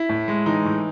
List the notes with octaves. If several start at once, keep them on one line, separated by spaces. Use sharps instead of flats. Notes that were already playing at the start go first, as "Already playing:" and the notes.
Already playing: E4
A2
G#3
E3 D#4
A2